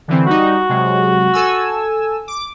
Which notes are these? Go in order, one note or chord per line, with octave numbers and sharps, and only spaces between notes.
D3 E3 C4
G3 D#4 F#4
C3 F#3 G#3
A4 G#5 E6
D6